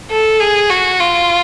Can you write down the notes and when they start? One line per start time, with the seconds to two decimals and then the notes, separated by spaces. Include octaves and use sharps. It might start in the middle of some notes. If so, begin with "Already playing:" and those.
0.11 A4
0.40 G#4
0.70 F#4
1.00 F4